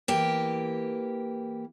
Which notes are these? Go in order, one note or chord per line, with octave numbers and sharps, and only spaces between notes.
E3 A#3 G4